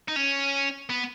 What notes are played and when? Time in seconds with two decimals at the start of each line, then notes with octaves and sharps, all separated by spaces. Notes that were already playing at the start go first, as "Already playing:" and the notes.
0.08 D#4
0.16 C#4
0.90 B3